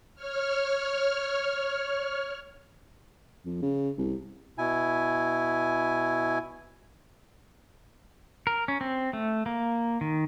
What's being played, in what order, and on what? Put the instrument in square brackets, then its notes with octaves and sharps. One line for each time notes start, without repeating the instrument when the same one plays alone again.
[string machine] C#5 F6
[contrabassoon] F2
C#3
C2
[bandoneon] B2 E4 G#5
[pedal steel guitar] A#4
C#4
C4
A3
A#3
D#3